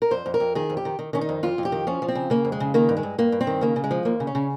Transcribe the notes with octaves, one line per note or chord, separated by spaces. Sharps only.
A#4
F2 C5
F2
A#4
F2
D#3 G#4
F2
G4
D#3
D#3
D#3 C#4
D#4
F2
F2 F4
F2
G4
D#3
F3 C#4
F3
C4
C#3
C#3 A#3
F2
G#3
C#3
D#3 A#3
G2
G#3
G2
G2 A#3
G2
C4
D#3
C#3 A#3
C#3
G#3
F3
D#2 A#3
C#3
C#4
C#3